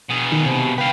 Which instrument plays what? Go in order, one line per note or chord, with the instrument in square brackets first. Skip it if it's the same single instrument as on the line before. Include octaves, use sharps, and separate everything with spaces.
[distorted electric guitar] B2 G#4
[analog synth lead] D#3
C3
[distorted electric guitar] B4 F5 [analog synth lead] G5